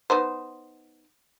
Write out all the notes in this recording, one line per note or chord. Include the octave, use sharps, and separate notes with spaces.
B3 D#4 C5